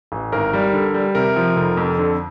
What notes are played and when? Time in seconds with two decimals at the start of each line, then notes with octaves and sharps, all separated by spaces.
0.12 A1
0.32 G#1 A#4
0.53 G3
0.73 D3
0.94 G3
1.15 C3 A#4
1.36 F3
1.56 F1
1.77 F2
1.98 D3